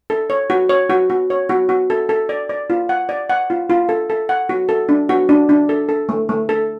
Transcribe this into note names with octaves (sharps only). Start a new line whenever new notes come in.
A4
C#5
F#4
C#5
F#4
F#4
C#5
F#4
F#4
A4
A4
D5
D5
F4
F#5
D5
F#5
F4
F4
A4
A4
F#5
F#4
A4
D4
F#4
D4
D4
A4
A4
A3
A3
A4